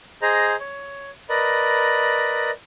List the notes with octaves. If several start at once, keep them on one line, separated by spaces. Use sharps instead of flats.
G#4 C5 D#5 A#5
C#5
A#4 B4 D5 D#5 B5